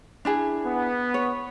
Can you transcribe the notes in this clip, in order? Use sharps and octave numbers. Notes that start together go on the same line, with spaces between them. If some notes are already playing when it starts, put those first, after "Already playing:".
D4 E4 G#4
B3
C#5